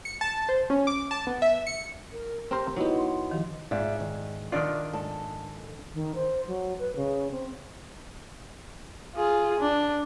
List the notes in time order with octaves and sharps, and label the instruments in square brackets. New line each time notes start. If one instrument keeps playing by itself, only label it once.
[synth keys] C#7
A5
C5
C#4
D6
A5
B3
E5
C#7
[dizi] A#4
[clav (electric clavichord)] C4 A#4 C5 [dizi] G4
[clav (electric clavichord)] F#3 B3 [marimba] D#4 E4 D#5
[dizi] C6
[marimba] D#3 F3 [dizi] G4
[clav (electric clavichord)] G#2 [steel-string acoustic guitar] F4 D5 E5
[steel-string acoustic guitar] D#3
[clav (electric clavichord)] D#3 D4 F4 [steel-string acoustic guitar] D5
[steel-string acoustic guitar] G#2 A4
[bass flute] D#3
C5
F#3
B4
C#3
C4
[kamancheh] F4 G#4
D4